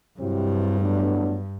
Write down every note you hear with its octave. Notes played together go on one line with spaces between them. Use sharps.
G2 C3 F#3 C4 E4 G4
A2 F#3 B3 D4